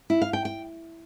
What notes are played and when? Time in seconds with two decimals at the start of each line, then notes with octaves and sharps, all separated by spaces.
0.10 E4
0.22 F5
0.33 G5
0.45 G5